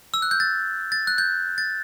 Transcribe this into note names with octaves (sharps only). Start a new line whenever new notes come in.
E6
F#6
G6
A6
A6
F#6
G6
A6